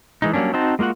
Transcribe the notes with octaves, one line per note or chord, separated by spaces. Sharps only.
E3 G#3 D#4
F#3 G3 A#3 C#4 D4
C4 D#4 F#4 C5 A5
G#3 A#3 F4 F#4 F#5